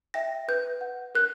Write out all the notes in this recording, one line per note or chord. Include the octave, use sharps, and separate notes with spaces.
E5 G5 A#6
B4 G6
F#5
A#4 F#6